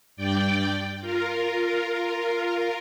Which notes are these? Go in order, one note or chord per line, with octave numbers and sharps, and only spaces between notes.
G2 D5 G5
F4 A#4